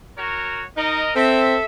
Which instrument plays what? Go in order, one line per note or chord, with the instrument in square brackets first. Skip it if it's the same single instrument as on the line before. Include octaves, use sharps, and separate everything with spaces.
[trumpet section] F#4 A#4 C#5
[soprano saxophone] D#4 [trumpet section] A#4 D#5
[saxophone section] C4 [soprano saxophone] A4 [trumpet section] E5